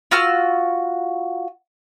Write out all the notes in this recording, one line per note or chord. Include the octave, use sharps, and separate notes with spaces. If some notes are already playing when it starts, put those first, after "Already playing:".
F4 F#4 E6 F6